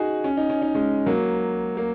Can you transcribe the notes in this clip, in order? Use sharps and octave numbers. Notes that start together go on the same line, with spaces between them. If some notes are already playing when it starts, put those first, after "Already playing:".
Already playing: D#4 F#4 G#4
C#4
D#4
C#4
D#4
G#3 C#4
F#3 A#3
A#3